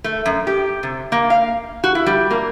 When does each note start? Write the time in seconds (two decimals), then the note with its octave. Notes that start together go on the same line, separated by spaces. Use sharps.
0.04 A3
0.26 F#2
0.47 G4
0.83 C3
1.12 A#3
1.30 F5
1.84 F#4
1.95 E4
2.06 G3
2.31 A#3